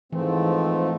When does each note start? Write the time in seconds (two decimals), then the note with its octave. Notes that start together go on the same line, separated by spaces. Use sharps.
0.12 G#2 E3 F3 A3 C4